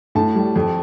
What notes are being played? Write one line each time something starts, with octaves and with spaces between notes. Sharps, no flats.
A2 A5
G3
F2